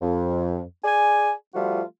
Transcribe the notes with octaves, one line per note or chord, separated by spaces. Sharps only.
F2
G#4 D5 G#5
F3 G3 A3 F4 F#4